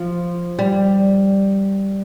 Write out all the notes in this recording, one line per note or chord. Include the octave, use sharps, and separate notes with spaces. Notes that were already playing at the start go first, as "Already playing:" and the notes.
Already playing: F3
G3